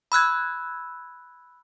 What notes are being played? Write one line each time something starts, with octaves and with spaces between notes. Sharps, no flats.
B5 E6 F#6 G#6